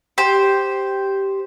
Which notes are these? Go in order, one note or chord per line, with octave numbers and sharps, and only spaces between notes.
G4 C5